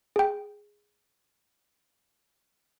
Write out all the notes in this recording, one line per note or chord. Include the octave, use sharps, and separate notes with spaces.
G#4 G5